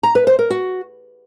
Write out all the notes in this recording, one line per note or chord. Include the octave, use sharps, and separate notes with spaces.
A#5
B4
C5
A#4
F#4